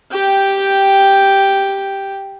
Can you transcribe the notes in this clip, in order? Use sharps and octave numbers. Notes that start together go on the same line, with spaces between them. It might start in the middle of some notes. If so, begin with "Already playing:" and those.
G4 G5